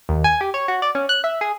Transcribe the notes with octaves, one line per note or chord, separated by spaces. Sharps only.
D#2
G#5
G4
C#5
F#4
D5
C#4
F#6
E5
G#4